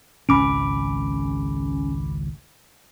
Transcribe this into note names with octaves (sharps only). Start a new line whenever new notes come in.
G#1 C#2 D#3 C#4 B5 D6 D7